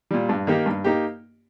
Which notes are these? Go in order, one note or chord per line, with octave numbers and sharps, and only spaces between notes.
A#2 G3
G2
D#3 A#3 D#4 G4
G2
A#3 D#4 G4